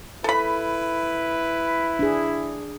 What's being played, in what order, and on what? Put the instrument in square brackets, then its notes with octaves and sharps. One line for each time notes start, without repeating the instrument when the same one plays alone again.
[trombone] E4 [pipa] A4 B5 [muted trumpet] B4
[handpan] D4 G#4